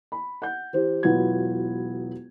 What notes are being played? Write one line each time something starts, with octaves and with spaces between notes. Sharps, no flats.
B5
F#5 G6
E3 G4 C5
E1 F#3 B3 E4 F4 G#6